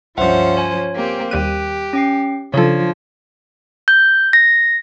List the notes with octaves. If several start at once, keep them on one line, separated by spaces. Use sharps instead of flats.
C#2 G2 F3 C#4 C5 E5 F#5
C#5 G#5
A#3 C4 G4
D#2 G3 G4 F#6 D#7
C#4 G5 C7
C#3 F3 D4 A4 C#5
G6
A#6